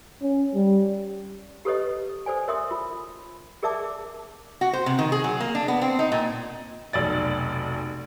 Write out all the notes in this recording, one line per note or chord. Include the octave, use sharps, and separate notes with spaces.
C#4
G3
G4 A4 B4 C#5 D#5
A4 C5 D5 G#5
A#4 C#5 E5 C6 D#6
F4
G#4 A#4 D5 E5 A5 D6
F#4
C5
C3
D#3
G#4
F#3
A#3
D4
B3
C4
D#4
A#2
F1 B1 D5 A6